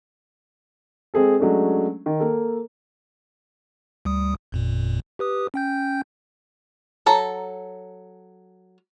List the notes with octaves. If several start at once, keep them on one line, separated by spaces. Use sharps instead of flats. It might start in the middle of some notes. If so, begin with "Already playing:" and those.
G#3 C4 G#4 A4
F#3 G#3 A3 C#4 D4
D#3
A#3 A4
D2 G3 D#6
G1 F2 A#2
G4 B4 D#6
C#4 G5 G6
F#3 A4 A#5